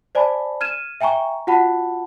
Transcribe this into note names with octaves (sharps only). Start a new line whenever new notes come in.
C5 D5 G#5 A5 B5
F6 G#6 D#7 E7
E5 G5 G#5 A#5 C#6
F4 F#4 F#5 A5 B5